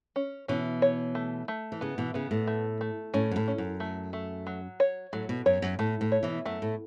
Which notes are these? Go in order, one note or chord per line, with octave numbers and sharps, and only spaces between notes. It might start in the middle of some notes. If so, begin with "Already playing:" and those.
C#4
B2 E3 C#4
C#5
A3
A3
E3
C#3 B3
B2 E3
C#3 B3
A2
A3
A3
A2 C#4
F#2
A2
C#4
F#2
A3
A3
F#3
C#5
A2 F#3
B2
F#2 C#5
F#2
A2 A3
A2
C#5
B2 E3
F#2 A3
A2